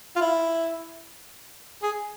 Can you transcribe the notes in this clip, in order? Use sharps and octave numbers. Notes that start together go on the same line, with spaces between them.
F4
E4
G#4